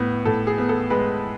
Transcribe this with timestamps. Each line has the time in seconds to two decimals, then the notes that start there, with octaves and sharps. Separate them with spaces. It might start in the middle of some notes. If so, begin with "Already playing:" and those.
Already playing: A2 B3
0.25 A2 A4
0.47 G#4
0.58 B3
0.69 A4
0.90 G#3 B4